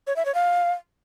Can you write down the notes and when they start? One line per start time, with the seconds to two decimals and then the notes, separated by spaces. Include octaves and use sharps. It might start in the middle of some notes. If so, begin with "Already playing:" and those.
0.07 C#5
0.16 E5
0.25 C#5
0.35 F5